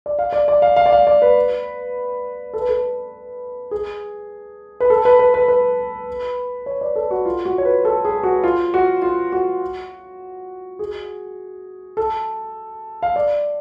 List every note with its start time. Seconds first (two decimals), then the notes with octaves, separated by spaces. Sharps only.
0.06 D5
0.19 F5
0.33 D5
0.48 D5
0.62 F5
0.76 F5
0.86 D5
0.92 F5
1.07 D5
1.22 B4
2.54 A4
2.62 B4
2.69 A4
3.71 G#4
4.80 B4
4.90 A4
5.05 B4
5.19 B4
5.34 B4
5.48 B4
6.66 C#5
6.81 D5
6.96 A4
7.11 F#4
7.25 F4
7.45 F#4
7.58 C#5
7.65 B4
7.85 A4
8.05 G#4
8.23 F#4
8.43 F4
8.74 F#4
9.02 F4
9.32 F#4
10.79 G#4
11.97 A4
13.03 F5
13.16 D5